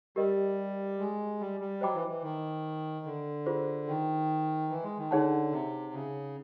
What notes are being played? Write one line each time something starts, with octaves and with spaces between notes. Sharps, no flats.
G3 G4 A#4 D#5
G#3
G3
G3
F#3 C5 D#5 G5 B5 D6
E3
E3
D#3
D3
F4 G#4 C5
D#3
E3
G#3
D#3
D3 D#4 G#4 C#5 F#5 A5
C3
C#3